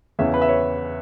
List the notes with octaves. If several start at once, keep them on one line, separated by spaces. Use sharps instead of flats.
E2 C#3 E3 C#4 E5
B4
E5
C#5